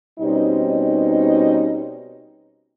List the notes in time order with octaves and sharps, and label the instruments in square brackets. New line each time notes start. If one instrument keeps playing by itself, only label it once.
[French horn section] B2 G3 C4 C#4 D#4